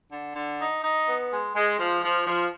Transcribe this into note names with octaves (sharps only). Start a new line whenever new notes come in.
D3
D3
D#4
D#4
B3
G#3
G#3
F3
F3
F3